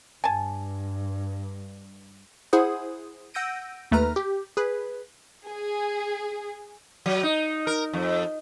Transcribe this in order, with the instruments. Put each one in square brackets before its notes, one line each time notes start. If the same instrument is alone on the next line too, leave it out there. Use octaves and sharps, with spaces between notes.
[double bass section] G2 [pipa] G#5 A5
[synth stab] E4 G#4 C5 F#5 D#6
F#5 E6 G6 A#6 D7 D#7
D#2 A3 B4 A#5 F6
G4
G#4 B4
[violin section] G#4
[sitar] F#3
D#4
A#4
F2